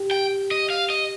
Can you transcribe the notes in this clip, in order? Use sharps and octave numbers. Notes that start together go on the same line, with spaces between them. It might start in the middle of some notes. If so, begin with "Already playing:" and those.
Already playing: G4
G5
D#5
F5
D#5